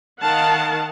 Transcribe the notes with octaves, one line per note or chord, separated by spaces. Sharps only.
D#3 A#4 F5 F#5 A5